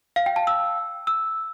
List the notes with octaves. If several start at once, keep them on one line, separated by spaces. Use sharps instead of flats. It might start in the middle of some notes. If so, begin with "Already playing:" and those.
F5
G5
A5
E6
E6